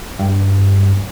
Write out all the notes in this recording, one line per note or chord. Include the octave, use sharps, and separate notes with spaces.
G2